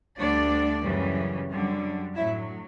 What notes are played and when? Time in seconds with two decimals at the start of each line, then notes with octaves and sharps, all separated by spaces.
0.19 D2 D3 G3 D4 D5
0.84 F#2 C#3 E3 G3
1.50 F#2 D3 G3
2.15 A2 F#3 E4 E5